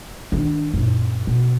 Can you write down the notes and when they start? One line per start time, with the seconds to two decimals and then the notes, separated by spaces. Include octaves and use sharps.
0.32 D#3 D4
0.74 F#2 A#2
1.27 B2